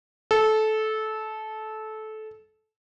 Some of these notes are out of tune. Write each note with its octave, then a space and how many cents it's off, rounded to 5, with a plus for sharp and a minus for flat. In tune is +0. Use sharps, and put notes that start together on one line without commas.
A4 -20